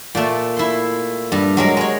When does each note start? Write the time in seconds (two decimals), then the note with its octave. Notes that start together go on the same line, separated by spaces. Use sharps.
0.15 A#2 A3
0.57 E4 C6
1.32 G2
1.57 F#3 G#3 A#4
1.77 G#3 C#5